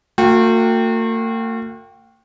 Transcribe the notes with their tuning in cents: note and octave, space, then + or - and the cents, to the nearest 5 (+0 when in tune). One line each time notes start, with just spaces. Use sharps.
A#3 -45 F#4 -40 G5 +0